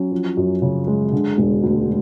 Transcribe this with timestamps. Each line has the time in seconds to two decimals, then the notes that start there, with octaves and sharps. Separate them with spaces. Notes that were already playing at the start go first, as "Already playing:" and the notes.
Already playing: F#3 C#4
0.12 F3
0.37 F#2
0.62 C#3
0.87 G#3
1.13 D3
1.38 E1
1.63 D2